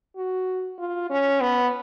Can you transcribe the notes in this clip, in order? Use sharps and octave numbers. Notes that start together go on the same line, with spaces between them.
F#4
F4
C#4
B3